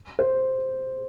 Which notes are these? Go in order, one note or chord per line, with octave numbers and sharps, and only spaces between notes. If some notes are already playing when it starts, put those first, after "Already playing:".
C5